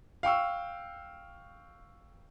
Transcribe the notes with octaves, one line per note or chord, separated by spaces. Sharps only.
F5 G5 C#6 E6